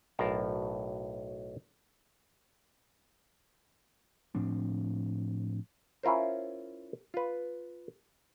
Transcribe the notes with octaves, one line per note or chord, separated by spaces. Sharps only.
B1 A2 A#4 F5 A5
A2 F3 C4 D4
C#4 E4 F4 A#4 C5
F4 B4